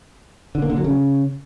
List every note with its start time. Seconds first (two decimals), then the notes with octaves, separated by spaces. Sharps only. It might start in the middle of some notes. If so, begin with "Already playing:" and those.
0.55 D3
0.62 A#3
0.70 D3
0.77 F#3
0.84 C#3